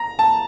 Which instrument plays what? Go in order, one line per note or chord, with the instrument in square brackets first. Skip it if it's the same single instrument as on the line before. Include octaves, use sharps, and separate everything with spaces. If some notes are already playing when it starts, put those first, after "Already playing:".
Already playing: [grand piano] A#5
A5